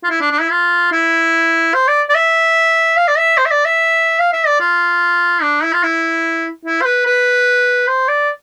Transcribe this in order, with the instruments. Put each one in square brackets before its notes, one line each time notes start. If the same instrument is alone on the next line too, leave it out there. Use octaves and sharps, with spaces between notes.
[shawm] F4
E4
D4
D4
E4
F4
E4
C5
D5
D5
E5
F5
D5
E5
C5
E5
D5
E5
F5
E5
D5
F4
D4
E4
F4
E4
E4
C5
B4
B4
C5
D5